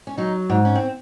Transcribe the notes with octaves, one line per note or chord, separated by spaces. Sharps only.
C#4
F#3 D#4
G#2
C#4
C4